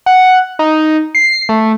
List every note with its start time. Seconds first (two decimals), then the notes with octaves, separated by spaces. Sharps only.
0.06 F#5
0.59 D#4
1.15 C7
1.49 A3